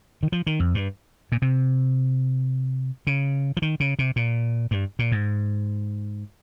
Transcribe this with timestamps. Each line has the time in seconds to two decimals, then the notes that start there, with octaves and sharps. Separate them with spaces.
0.23 D#3
0.32 F3
0.47 D#3
0.60 F2
0.74 G2
1.32 A#2
1.42 C3
3.07 C#3
3.57 F3
3.62 D#3
3.80 C#3
3.99 C3
4.16 A#2
4.71 G2
4.99 A#2
5.12 G#2